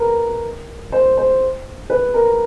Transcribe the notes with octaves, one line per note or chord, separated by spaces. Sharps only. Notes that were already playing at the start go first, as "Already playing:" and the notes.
Already playing: A#4 B4
C5
C5
B4
A#4